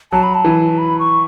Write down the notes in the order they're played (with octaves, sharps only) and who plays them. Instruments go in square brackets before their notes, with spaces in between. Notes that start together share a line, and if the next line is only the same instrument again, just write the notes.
[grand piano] F#3 [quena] A5
[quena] B5
A5
[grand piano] E3
[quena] B5
C#6